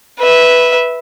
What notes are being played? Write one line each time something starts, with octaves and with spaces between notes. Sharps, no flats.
B4 E5